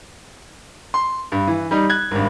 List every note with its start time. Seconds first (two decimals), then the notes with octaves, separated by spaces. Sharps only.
0.94 C6
1.32 G2
1.47 E3
1.71 G3 D#4
1.89 F#6 G#6
2.11 G#1 G2